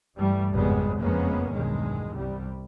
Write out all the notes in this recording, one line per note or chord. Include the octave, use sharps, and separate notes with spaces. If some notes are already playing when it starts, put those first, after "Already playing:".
G2 E3 G3 A3
G#1 F2 C#3 G3 G#3 B3
F#1 F2 G#3 A#3 B3 C#4
B1 E2 G2 D#3 G#3
C2 G3